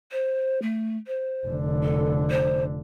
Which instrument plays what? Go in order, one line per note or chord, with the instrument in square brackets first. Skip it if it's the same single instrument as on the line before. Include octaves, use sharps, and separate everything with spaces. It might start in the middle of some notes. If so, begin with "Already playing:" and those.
[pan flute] C5
A3
C5
[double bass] F1 D3
[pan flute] A4
C5